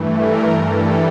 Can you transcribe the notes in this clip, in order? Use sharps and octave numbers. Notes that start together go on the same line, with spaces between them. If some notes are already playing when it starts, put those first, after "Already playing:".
Already playing: G2 E3 A3
A#4
G2 E3 G3 A4